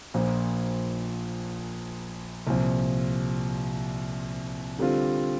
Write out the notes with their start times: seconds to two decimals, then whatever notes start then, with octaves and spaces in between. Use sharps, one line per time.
0.14 A#1 A#2 F3
2.47 C2 A#2 F3
4.78 D3 G3 C4 F4